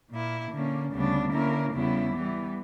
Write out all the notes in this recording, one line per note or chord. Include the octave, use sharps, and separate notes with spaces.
A#2 A#3 E4
D3 A#3 C#4
D2 C#3 G3 B3 D4
D3 A#3 C#4 E4 A#4
E2 C#3 G3 B3 E4
E3 G3 B3